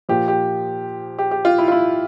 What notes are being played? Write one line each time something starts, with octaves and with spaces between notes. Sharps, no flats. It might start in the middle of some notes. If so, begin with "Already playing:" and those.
A#2 F3 G4
G4
G4
G4
F4
E4
F4
E4